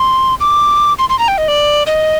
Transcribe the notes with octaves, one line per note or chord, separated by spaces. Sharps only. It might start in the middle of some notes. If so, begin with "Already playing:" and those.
Already playing: C6
D6
C6
C6
A#5
G5
D#5
D5
D#5